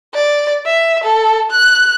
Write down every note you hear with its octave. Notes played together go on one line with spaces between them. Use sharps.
D5
E5
A4
F#6